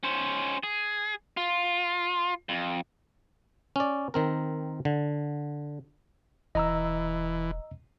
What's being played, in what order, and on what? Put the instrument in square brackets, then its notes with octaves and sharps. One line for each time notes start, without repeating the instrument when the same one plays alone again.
[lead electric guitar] C#4 C5
G#4
F4
F2
[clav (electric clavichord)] C#4 D5
D#3 C4 A#4
D3
[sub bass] E1 [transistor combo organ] E3 [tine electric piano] D#5 A#5 E6